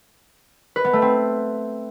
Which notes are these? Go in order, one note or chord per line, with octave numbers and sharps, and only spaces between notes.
B4
B3
A3
C4